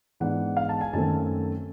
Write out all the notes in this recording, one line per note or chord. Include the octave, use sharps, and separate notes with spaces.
G#2 E3 G#3 B3 D4 F#5
F5
A5
G#5
F#2 D#3 F#3 A3 C4 A5